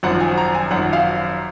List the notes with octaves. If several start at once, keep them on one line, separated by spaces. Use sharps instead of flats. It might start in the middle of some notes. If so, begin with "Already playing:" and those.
G#1 F#2 F3 F#5
G#5
A#5
G#5
G#1 F#2 F3 F#5
F5